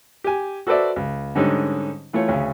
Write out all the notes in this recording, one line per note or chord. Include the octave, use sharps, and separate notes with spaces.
G4 G#5
F#4 A4 B4 C5 D5 E5
C#2
G#2 D3 G3 C#4 D#4
E3 A3 F4 C#5
D2 C#3 C#4